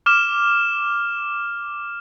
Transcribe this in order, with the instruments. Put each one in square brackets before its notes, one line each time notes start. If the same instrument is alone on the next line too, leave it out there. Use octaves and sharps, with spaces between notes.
[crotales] D6 F6 E7